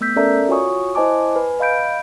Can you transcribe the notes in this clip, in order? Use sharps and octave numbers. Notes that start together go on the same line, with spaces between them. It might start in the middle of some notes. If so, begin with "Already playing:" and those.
A3 B3 E6 G6 B6
C#4 A4 A#4 D5 E5 A#5
F4 F#4 C#5 G#5 C#6 D#6
E4 C5 D#5 G#5 A5 D6
B4 G#5
D#5 F5 B5 G6 D7